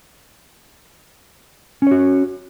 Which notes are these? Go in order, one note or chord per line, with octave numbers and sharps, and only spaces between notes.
C#4 F#4 C#5